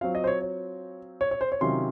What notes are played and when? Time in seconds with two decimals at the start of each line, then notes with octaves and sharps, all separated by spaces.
0.01 F#3 C4 F4 F5
0.15 D#5
0.24 C5
0.27 C#5
0.42 C#5
1.21 C#5
1.31 C#5
1.41 C5
1.52 C#5
1.61 C3 D#3 F#3 C#4 F4 C6